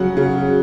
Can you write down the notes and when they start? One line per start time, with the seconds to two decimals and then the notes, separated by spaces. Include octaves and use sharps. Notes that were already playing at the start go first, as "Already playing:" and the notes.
Already playing: C#3 F#3 F#5
0.17 C#3